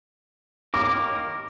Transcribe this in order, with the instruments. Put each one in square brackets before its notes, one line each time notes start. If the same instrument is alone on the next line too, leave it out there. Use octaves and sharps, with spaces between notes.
[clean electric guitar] D#3 A#3 A#4 [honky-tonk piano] D6